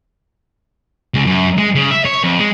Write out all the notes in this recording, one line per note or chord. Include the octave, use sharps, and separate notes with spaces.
C#2
F#2
G#3
C#3
E5
C#5
F2
G#3